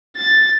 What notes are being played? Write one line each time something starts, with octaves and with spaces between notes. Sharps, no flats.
A6